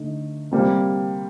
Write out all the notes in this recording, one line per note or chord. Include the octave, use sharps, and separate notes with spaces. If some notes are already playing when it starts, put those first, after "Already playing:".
Already playing: D3 A3 D#4
C3 G3 A#3